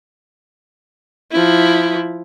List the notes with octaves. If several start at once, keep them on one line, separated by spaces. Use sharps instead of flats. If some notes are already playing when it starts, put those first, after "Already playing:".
F3 E4